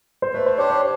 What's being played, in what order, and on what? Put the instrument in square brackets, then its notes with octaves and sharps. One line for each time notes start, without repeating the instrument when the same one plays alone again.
[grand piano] C5
[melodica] A3 [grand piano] B4
[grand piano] C5
[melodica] D4 G4 C5 [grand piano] C#5
[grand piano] C#5